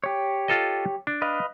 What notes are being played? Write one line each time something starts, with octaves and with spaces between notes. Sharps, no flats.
G4 C#5
F4 A4 D#5
D4
B4 D#5 F5